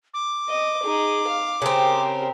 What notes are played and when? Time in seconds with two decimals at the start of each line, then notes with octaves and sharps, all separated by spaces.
0.14 D6
0.49 D#5
0.83 D#4 G#4
1.27 F5
1.62 C#3 C4 G4 A#4